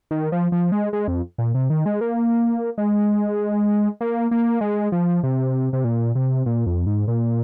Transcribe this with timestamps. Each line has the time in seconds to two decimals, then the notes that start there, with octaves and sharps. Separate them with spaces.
0.11 D#3
0.32 F3
0.52 F3
0.72 G#3
0.93 G#3
1.08 F2
1.38 A#2
1.54 C3
1.70 D#3
1.86 G#3
2.01 A#3
2.78 G#3
4.01 A#3
4.31 A#3
4.61 G#3
4.92 F3
5.23 C3
5.73 C3
5.84 A#2
6.15 C3
6.46 A#2
6.66 F2
6.86 G#2
7.08 A#2